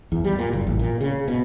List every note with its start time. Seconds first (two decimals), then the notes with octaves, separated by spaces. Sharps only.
0.12 E2
0.24 G3
0.39 A#2
0.53 F#1
0.67 A1
0.79 A#2
1.01 C#3
1.28 B2